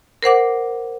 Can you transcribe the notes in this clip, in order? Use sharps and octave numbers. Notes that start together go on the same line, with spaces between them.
A#4 C5 F#5 D6